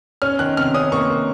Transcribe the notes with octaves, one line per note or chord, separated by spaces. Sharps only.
C#4 F6
D#3 F#6
C3 F6
C#4 D#6
A#3 C#6
A#3